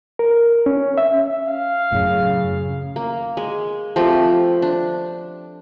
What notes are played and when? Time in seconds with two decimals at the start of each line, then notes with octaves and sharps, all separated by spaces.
0.19 A#4
0.66 C#4
0.98 E5
1.48 F5
1.92 F#2 A2 C#3
2.96 A#3
3.37 G#3
3.96 F3 A3 C4 G4
4.62 D4